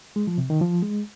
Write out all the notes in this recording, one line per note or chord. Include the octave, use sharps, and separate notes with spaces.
G#3
F3
C3
D#3
F3
G#3